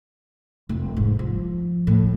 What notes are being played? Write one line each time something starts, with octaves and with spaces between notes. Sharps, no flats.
F1
G#2
F3
A2